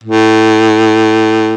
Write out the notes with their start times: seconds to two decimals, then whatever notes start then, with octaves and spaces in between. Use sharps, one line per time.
0.04 A2